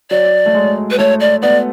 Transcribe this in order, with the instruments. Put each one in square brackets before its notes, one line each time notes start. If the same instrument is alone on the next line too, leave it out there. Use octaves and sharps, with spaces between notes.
[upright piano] F#3 [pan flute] D5
[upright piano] A3
G#3
[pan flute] B4
[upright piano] A3 [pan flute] C#5
[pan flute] D5
[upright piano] B3 [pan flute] D5